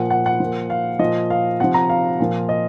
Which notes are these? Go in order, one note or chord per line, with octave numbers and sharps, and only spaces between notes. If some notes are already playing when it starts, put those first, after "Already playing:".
Already playing: A#2 F3 F#5
F#5
F#5
A#2 F3
F5
A#2 F3 D#5
F5
C3 F3 F#5
A#5
F5
A#2 F3
D#5